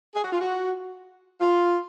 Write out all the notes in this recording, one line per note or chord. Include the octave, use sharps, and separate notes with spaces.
G#4
F#4
F4
F#4
F4